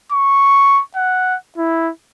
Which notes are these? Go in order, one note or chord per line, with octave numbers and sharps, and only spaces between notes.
C#6
F#5
E4